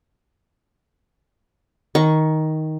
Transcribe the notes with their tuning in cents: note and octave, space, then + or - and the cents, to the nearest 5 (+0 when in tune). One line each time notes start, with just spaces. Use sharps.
D#3 +10 C#6 +0